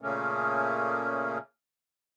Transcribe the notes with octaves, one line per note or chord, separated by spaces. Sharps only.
A#2 C#3 A3 A#3 C#4